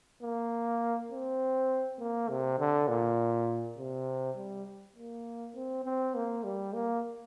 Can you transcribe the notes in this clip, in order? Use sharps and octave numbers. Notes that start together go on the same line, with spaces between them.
A#3
C4
A#3
C3
D3
A#2
C3
G3
A#3
C4
C4
A#3
G3
A#3